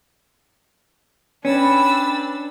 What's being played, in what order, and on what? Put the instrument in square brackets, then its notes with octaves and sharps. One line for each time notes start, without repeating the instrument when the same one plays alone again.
[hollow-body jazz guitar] C#4 [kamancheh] D4 [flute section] B4 G5 B5 [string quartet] E6 A6